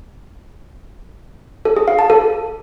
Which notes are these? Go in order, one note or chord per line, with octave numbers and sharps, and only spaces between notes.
A4
G#4
F5
A5
A4